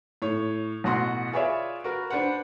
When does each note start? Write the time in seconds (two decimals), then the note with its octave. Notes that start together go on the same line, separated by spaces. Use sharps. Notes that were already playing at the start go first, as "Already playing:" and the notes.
0.22 A2 C#5
0.84 A1 B2 F#4 F#5 C6
1.33 F4 G#4 B4 C#5 D5 E5
1.84 F#4 A#4 B4
2.10 D4 B4 C5 F#5